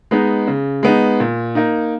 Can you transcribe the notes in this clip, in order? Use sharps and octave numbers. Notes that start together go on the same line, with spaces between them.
G#3 B3 D#4
C#3
G#3 B3 D#4
A#2
A#3 D#4